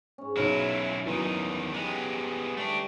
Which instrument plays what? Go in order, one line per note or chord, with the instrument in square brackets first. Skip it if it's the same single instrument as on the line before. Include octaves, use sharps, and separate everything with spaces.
[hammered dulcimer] G#2 C#4
[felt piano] B1 C#5 F6 [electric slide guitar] F#3 E4
[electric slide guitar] E2 D#3 D#4 [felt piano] E3 F#3
[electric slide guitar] G#3 B3 [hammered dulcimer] G4
[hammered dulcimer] G3 C#6 [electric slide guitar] A3 D4